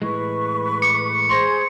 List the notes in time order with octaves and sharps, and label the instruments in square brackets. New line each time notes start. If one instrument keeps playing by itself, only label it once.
[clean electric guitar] A2 E3 G#3 [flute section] B4 C#6
[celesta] D6 [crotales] C#7
[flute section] G#4 C5 [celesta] C6 C#6 A#6